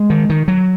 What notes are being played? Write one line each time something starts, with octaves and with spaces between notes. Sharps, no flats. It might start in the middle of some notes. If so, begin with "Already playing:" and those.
Already playing: G#3
D#3
D#3
F#3